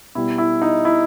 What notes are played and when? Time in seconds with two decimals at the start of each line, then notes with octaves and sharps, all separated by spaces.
0.15 B2 G3 B3 E4
0.38 E4
0.62 D#4
0.85 E4